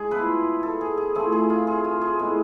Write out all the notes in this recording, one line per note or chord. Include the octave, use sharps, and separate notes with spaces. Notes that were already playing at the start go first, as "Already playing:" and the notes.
Already playing: G#3 D4 G#4
F3 B3 E4 B4
A4
G#4
G#4
F3 A3 C4 E4 G#4
G#4
F4
G#4
F4
G#4
A2 G#3 B3